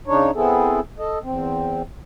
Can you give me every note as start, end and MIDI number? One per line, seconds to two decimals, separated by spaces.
0.07 0.31 49
0.07 0.31 62
0.07 0.31 63
0.07 0.31 73
0.35 0.80 59
0.35 0.80 60
0.35 0.80 64
0.35 0.80 68
0.35 0.80 69
0.99 1.19 69
0.99 1.19 75
1.23 1.82 40
1.23 1.82 60